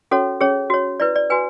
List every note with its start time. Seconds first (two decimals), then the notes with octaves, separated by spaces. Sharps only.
0.11 C#4 F#4 A4 C#5
0.41 C#4 G#4 C#5
0.70 F#4 C#5
1.00 E4 B4 D5
1.16 D5
1.30 F#4 B4 G#5